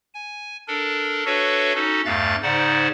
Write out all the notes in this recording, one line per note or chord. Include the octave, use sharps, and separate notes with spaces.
G#5
D4 A4 A#4
D4 F#4 A4 B4 C#5 E5
C#4 D#4 F#4 A4
E2 G2 A3 F5 F#6 A6
G#2 C#3 D#4 C5 D5 F#5